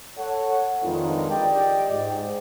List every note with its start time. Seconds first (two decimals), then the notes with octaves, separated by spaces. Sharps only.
0.17 A4 C#5 F#5
0.84 F2 D#3 G#3 D4 F4 B4
1.30 G4 D5 D#5 G5
1.91 G#2